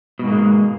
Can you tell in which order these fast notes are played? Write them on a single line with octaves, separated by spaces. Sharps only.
B2 G#2 A#3 G#3